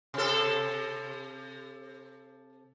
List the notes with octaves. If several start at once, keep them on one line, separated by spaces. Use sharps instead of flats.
C3 A4